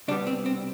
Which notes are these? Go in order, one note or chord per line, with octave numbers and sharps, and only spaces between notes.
C2 B2 G3 B3 D4
C4
C4